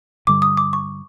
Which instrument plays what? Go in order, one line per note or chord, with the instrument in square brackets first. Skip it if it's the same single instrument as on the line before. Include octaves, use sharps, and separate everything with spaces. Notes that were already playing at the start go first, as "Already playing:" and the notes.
[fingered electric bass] G2 D3 G3 [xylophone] D6
[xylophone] D#6
D6
C#6